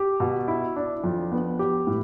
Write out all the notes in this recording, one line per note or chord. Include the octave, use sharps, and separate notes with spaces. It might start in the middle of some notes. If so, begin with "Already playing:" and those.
Already playing: G4
B2
E4
D4
F2
B3
G4
A2